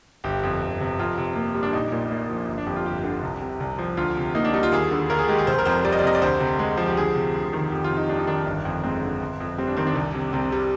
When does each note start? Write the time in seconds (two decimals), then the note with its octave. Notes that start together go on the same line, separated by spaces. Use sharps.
0.24 G1 G4
0.43 F2
0.62 G1
0.80 C3
0.99 F2 F4
1.18 C3
1.36 A#3
1.55 G3
1.63 D4
1.73 A#1 D#4
1.92 A#2
2.11 A#3
2.30 F3
2.48 G1
2.58 D4
2.67 F2 G4
2.76 F4
2.86 G1 G4
3.04 D3
3.23 C2
3.41 C3
3.60 C2
3.78 F3
3.97 D2 F4
4.17 C3
4.35 A#3 D#4
4.45 D4
4.54 G3 D#4
4.63 F4
4.72 D#2 G#4
4.91 D3
5.10 D#2 A#4
5.19 G#4
5.28 G#3 G4
5.38 G#4
5.47 F1 C5
5.58 A#4
5.65 F2 C5
5.85 G3 D5
5.92 D#5
5.99 D5
6.03 C3 D#5
6.15 D5
6.22 D2 C5
6.40 C3
6.59 G#3
6.77 F3
6.86 G4
6.97 D2 G#4
7.15 C3
7.35 D2
7.53 D#3
7.71 F2 G4
7.84 F4
7.91 C3
7.97 D#4
8.09 G3 D4
8.19 D#4
8.27 D#3 D4
8.37 D#4
8.45 G1 D4
8.65 F2
8.83 G#3 C4
9.02 D3
9.21 G1
9.40 F2
9.58 G3 C4
9.67 D4
9.77 D#3 C4
9.87 D4
9.95 C2
10.14 C3
10.33 C2 C4
10.52 G3